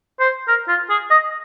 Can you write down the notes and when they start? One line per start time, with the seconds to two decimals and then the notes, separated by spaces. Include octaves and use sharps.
0.20 C5
0.48 A#4
0.68 F4
0.90 G#4
1.11 D#5